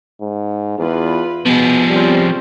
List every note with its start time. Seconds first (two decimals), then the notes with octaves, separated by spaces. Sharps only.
0.21 G#2
0.78 E2 F4 B4
1.46 B2 F3 B3 G#4
1.89 G3 C4 C#4 F4